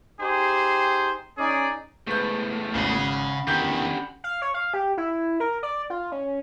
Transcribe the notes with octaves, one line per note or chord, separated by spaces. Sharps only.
D#4 G4 G#4 C5
C#4 D#4 G#4 D5
E2 G#3 A3 B4 C5 G6
G#1 C#3 C#4 G#4 F#5 B5
E2 D3 D#3 G4 G6
F5
C#5
F5
G4
E4
A#4
D5
F4
C#4